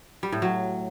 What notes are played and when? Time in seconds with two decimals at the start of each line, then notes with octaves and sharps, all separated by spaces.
0.23 G3
0.32 A2
0.42 F#3